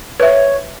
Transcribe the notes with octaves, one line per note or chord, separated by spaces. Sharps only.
B4 C#5 E5